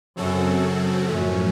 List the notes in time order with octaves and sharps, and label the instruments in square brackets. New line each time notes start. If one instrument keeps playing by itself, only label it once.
[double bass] F#2 [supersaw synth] C#3 F#3 C4 F#4 A4
[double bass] F#2 [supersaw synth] A2 F3 A3 C#4